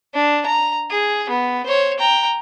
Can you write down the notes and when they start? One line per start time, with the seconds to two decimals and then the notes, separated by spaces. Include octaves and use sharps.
0.14 D4
0.46 A#5
0.90 G#4
1.29 B3
1.66 C5 C#5
1.99 G5 A#5